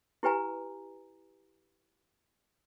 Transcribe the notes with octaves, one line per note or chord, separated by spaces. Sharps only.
E4 G4 B4 G#5 A#5